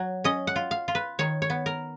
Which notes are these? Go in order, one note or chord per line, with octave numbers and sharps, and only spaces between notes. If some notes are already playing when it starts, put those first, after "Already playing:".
Already playing: F#3
C#4 D#5
F#5
F4
F5
F4
B4
D#3 C#5
C#5
B3
A#4